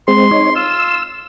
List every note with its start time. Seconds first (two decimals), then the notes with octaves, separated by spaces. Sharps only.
0.08 G#3 C4 C6
0.31 D#4 C#5
0.56 F4 E6